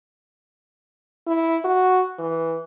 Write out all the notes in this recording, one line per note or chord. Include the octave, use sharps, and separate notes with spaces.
E4
F#4
E3